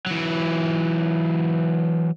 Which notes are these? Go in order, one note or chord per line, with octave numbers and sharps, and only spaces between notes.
E3 F#3